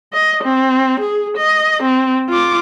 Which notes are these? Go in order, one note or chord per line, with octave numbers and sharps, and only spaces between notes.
D#5
C4
G#4
D#5
C4
F4 D6